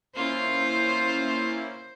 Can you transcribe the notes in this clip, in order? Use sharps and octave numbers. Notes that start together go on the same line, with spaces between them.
A#3 C#4 E4 F4 C5